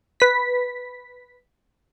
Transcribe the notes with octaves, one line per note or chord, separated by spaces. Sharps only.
B4 B6